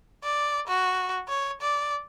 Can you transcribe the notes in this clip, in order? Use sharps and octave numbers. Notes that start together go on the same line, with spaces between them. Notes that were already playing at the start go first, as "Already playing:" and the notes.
D5
F#4
C#5
D5